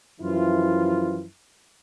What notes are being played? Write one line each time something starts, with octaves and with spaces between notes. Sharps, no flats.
F#2 E3 F3 E4 F4